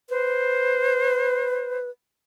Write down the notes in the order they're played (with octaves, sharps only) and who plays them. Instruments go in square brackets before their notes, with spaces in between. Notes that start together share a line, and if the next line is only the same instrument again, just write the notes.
[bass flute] B4 [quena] C5